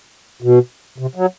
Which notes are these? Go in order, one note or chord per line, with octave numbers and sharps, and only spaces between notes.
B2
C3
F#3